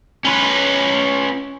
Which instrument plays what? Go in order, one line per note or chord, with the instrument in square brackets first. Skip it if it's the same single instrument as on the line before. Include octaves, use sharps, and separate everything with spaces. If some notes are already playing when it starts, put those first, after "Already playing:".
[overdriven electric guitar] C#4 B4